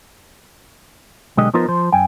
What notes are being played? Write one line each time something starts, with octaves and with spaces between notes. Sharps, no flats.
B1 D3 G#3 G4 D#5
F3 B3 D#4 F4 A#4 C5
F3 C5
F#2 G5 G#5